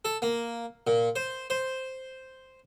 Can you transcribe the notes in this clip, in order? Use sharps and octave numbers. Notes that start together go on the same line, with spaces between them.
A4
A#3
A#2
C5
C5